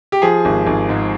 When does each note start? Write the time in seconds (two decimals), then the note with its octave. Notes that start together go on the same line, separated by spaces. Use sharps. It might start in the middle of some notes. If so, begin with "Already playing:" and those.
0.12 G4
0.22 F3 G#4
0.45 G#1
0.67 G#1
0.89 G#2